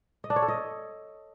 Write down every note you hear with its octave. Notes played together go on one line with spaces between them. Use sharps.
D#5
D4
C#5
A4
D#5